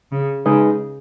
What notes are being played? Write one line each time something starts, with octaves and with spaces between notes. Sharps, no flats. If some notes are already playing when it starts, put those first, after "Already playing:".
C#3
C#3 G#3 D#4 G#4 B4 D#5